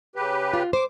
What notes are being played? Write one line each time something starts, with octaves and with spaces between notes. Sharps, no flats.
C#3 G4 B4
F4
C5 D6